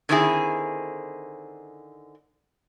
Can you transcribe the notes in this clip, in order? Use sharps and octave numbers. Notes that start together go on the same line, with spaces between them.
D3 D#3 C4 D4 E4 G#4